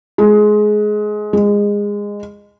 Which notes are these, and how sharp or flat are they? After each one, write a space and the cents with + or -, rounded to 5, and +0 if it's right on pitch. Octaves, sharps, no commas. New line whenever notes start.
G#3 +20
G#3 -20